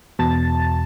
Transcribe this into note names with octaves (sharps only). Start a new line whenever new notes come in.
E2 B2 A5 A6